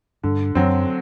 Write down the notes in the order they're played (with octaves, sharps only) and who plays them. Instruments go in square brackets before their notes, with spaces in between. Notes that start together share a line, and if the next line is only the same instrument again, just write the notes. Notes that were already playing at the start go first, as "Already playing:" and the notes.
[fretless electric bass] G2 [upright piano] D3
[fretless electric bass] F#2 [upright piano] F#3 C4